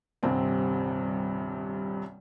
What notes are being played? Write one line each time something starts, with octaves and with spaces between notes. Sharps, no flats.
D#1 C2 G2 C3 C4